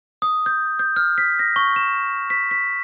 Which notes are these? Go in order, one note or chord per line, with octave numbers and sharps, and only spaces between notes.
D#6
G6
G6
F6
B6
A#6
C#6
E7
B6
B6